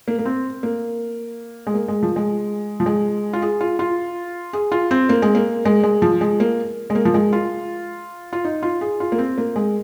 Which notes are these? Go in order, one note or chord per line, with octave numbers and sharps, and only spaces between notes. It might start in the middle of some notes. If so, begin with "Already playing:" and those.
A#3
A#3
C4
A#3
G#3
A#3
G#3
F3
G#3
F3
G#3
F4
G#4
F4
F4
G#4
F4
C4
A#3
G#3
A#3
G#3
G#3
F3
G#3
A#3
G#3
A#3
F3
G#3
F4
F4
D#4
F4
G#4
F4
A#3
C4
A#3
G#3